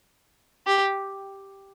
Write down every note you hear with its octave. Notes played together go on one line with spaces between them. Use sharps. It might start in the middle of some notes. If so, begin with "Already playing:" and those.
G4